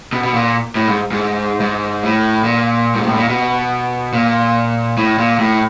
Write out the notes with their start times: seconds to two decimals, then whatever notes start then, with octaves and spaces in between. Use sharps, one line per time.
0.13 B2
0.23 B2
0.34 A#2
0.75 A2
0.88 G#2
1.11 G#2
1.60 G#2
2.03 A2
2.44 A#2
2.95 G#2
3.07 A2
3.17 A#2
3.28 B2
4.13 A#2
4.97 A2
5.18 A#2
5.39 A2